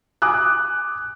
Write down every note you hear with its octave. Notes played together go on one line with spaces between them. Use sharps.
G#5 D6 D#6 F#6